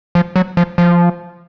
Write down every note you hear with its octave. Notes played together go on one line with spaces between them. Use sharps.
F3
F#3
F3
F3